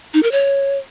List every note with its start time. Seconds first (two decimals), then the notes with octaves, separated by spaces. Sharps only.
0.14 D#4
0.23 A#4
0.32 C#5